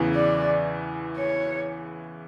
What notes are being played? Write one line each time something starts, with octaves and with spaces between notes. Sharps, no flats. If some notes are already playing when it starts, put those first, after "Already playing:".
Already playing: E2 C#3 E3
D5
C#5